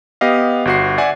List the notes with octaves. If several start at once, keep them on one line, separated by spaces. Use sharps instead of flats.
B3 G4 D#5 F5
G1 F#4 C7
D5 E5 F#5 G#5